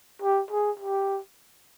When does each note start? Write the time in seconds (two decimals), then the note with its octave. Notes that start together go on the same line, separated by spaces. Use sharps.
0.22 G4
0.51 G#4
0.80 G4